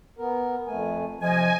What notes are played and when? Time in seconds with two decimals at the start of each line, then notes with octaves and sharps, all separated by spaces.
0.19 B3 A#4
0.67 F2 A3 G#5
1.21 C3 F3 D#5 G#5